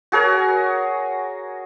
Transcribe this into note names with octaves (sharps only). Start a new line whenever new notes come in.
F#4 G#4 A#4 C#5